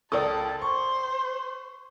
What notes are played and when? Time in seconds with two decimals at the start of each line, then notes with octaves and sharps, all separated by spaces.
0.12 C#2 A4 A#4 D5 A5 D#6
0.62 C5 C#6